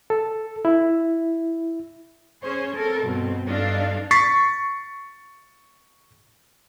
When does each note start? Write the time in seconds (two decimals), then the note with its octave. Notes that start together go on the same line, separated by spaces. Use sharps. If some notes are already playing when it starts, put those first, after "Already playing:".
0.10 A4
0.65 E4
2.41 C#4 G#4 C5 C#5
2.73 C4 A4 A#4
3.03 G2 B2 C4
3.46 G2 D4 D#4 A4 F5
4.11 C#6 A6 B6 C7